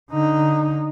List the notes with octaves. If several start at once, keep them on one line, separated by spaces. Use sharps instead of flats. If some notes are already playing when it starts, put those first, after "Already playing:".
D3 D#4